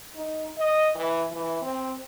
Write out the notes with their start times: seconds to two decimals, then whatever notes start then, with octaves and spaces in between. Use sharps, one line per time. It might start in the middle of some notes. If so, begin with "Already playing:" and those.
0.15 D#4
0.58 D#5
0.95 E3
1.32 E3
1.62 C4